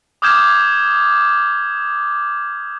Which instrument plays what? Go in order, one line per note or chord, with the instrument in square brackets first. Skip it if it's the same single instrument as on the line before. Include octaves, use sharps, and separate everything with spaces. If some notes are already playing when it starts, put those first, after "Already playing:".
[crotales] D6 D#6 F6 G6 G#6 E7